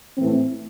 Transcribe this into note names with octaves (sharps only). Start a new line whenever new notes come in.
A2 E3 A3 C4